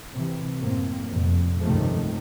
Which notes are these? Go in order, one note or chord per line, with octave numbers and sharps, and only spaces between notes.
C3 E3
F#2 A2 A#3 C4
F1 F2 A#2
C#2 G2 C3 D#3 F3 A3